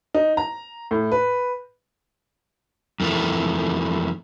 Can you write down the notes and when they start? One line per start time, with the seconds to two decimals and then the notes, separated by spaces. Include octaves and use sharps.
0.14 D#4
0.37 A#5
0.91 A2
1.12 B4
3.00 F2 D#3 E3 A3